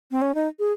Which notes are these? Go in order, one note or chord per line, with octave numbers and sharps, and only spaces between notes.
C4
C#4
D#4
G#4